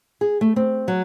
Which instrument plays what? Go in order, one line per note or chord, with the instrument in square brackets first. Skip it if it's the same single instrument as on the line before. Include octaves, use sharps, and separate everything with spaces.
[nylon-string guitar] G#4
A3
C4
F#3